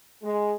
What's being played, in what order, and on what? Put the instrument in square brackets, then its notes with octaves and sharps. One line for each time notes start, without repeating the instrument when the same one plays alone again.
[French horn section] G#3